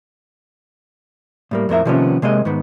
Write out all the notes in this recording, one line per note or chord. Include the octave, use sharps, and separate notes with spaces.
A2 G3 A#3
F2 A2 A#4 E5
C3 D#3 F3 A#3 B3 C#4
C3 G#3 A#3 D#5
G#2 D#3 B3